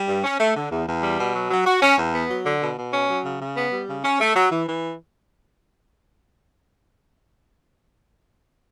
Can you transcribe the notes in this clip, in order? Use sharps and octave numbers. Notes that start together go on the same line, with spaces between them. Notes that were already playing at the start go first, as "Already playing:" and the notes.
Already playing: G3
G2
C#4
A3
D3
E2
E2
G3
B2
F#3
F#3
F#4
C#4
E2
B3
F#3
D3
B2
B2
C#4
F#3
C#3
C#3
B3
G3
C#3
C#4
A3
F#3
E3
E3